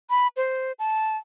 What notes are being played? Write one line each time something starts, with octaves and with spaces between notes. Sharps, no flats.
B5
C5
A5